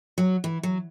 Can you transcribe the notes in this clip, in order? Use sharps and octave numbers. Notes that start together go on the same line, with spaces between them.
F#3
E3
F#3